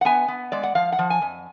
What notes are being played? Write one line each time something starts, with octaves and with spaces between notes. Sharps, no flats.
F#5
B3 G#5
B3
G#3 D5
F#5
F3 F5
F#5
F3
G#5
F2